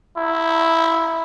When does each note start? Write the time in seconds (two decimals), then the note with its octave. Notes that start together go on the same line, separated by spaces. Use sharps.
0.17 E4